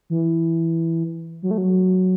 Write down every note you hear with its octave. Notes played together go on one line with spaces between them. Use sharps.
E3
F#3
A3
F#3